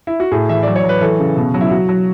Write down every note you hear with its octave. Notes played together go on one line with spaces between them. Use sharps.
E4
F#4
A2 G#4
E3 E5
F#3 D5
C#5
F#3
B4
E3 A4
C#3
B2
F#3
E4
F#3 F#4
F#3